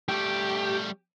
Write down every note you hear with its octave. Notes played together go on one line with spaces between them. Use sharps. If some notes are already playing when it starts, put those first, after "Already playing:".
G3 A3 G4